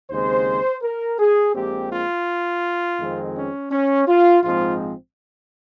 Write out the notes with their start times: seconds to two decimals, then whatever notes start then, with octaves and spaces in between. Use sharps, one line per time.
0.10 D#2 C#3 G#3 C4 C5
0.82 A#4
1.19 G#4
1.55 A#1 A#2 G#3 C4 G4
1.91 F4
2.99 F2 D#3 G#3 C4
3.35 C#4
3.71 C#4
4.08 F4
4.43 A#1 G#2 F3 G#3 C4 F4